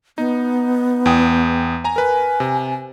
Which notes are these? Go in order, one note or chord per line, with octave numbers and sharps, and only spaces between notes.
B3 D#4
E2 G5 D#6
G#5 A#5
A#4 B4 G#5
C3